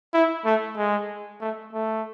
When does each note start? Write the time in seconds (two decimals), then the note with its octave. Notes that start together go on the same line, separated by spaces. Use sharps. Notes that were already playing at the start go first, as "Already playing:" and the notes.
0.14 E4
0.45 A3
0.77 G#3
1.41 A3
1.73 A3